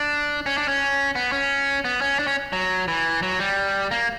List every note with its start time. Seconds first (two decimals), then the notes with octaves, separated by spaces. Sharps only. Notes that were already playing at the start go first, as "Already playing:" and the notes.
Already playing: D4
0.46 C#4
0.58 D4
0.68 C#4
1.15 B3
1.32 C#4
1.85 B3
2.01 C#4
2.19 D4
2.27 C#4
2.53 F#3
2.88 E3
3.23 F#3
3.40 G3
3.91 A#3